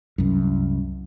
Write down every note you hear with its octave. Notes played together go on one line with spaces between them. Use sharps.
C2 F#2